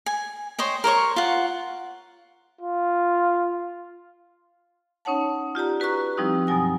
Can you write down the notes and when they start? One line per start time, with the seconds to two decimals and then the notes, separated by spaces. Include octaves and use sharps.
0.06 G#5
0.59 C5 C#5 D#5 G5
0.84 A#4 C5 C#5 C#6
1.16 F4 F#5
2.61 F4
5.05 C#4 D#4 C#5 F#5 A5
5.55 F4 G4 D5 A#5
5.80 F#4 B4 A#5 C#6 F#6
6.17 F3 G3 C4 D#4 E4 G4
6.47 F#2 B2 F#3 G#5 A#6